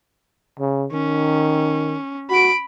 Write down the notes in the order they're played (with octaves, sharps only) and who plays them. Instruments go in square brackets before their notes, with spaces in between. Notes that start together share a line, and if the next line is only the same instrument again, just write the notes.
[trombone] C#3
[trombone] D#3 [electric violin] C#4
[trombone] F#4 [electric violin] B5 D7